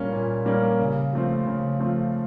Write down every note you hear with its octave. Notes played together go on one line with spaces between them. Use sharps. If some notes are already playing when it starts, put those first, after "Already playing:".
Already playing: A#2 G3 A#3 C#4
A#2
G3 A#3 C#4
C#3
F3 A3 C4
C#3
F3 A3 C4